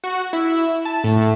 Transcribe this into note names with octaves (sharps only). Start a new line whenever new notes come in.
F#4
E4
A5
A2